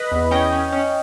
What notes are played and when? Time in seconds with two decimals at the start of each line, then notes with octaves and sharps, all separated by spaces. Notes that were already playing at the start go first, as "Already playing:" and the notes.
Already playing: B4 D#5
0.12 E2
0.31 C#4 D#5 G5
0.52 C#4
0.72 C#4